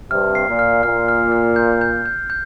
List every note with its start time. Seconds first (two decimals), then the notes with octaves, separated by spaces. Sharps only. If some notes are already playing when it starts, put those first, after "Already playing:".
0.10 G2 C3 F6
0.35 C7
0.48 A#2
0.59 F6
0.83 A#2 F6
1.08 F6
1.32 F6
1.56 G6
1.81 G6
2.06 G6
2.30 G6